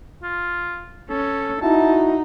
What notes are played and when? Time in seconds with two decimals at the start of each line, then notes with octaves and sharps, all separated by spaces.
0.23 F4
1.10 C#4 A4
1.62 D#4 E4 F#4 A5